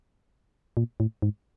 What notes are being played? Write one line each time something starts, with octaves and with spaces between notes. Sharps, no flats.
A#2
A2
G#2